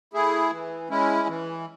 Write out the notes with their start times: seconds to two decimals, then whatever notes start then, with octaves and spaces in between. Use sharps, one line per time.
0.13 A3 E4 G#4
0.50 E3
0.89 G#3 C#4 E4
1.28 E3